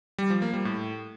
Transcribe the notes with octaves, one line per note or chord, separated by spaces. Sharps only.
G3
F3
A#3
G3
A2